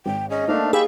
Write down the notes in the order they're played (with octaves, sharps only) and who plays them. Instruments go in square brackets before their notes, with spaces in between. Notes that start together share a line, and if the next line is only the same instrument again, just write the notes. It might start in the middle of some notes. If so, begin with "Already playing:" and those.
[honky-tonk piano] G#1 [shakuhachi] G5
[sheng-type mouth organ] C#4 G#4 [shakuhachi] D#5
[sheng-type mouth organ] A3 D4 F5 [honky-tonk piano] A#3 D#4 C5
[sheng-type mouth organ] G4 B5 E6 [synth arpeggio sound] G#4 [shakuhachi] F5